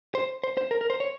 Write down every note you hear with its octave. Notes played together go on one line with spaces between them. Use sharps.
C5
C5
C5
A#4
A#4
C5
C#5